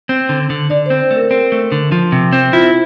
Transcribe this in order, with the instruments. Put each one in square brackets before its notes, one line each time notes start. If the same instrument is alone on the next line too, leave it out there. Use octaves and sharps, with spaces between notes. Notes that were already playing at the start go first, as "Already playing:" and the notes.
[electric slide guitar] C4
D3
D3
[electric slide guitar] D3 [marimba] D5
[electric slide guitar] C4 [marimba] C5
[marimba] C5
[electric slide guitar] A3
[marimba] A#4
[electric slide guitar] C4 [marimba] A#4
[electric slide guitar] A3
D3
F3
C3
C4
[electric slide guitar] E4 [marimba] F4